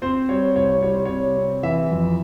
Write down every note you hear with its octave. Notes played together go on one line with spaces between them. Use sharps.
C4 C5
G3 C#5
C2 C#5
G3 C#5
C5
C3 C#5
C4
E3 E5
F2